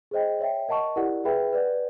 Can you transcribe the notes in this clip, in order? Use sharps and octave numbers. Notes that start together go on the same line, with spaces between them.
G#4 C5 D#5 G5
C#5 E5 G5
A#4 D#5 F#5 A5 C#6
E4 G4 A#4 D5 F#5
G#4 B4 E5 G5 B5
B4 D5 F#5